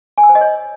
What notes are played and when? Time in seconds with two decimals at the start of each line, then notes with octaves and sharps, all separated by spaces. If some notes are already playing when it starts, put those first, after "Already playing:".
0.18 G#5
0.23 E6
0.29 C5
0.35 D#5
0.41 C#5